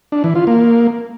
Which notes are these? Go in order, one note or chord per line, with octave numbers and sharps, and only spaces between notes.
D4
E3
F4
A#3